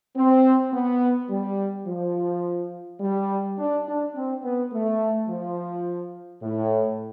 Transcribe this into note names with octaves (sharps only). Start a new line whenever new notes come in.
C4
B3
G3
F3
G3
D4
D4
C4
B3
A3
F3
A2